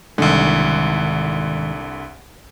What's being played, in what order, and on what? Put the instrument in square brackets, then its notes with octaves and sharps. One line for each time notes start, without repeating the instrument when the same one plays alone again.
[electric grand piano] C2 D3 [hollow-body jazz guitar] G#2 D#3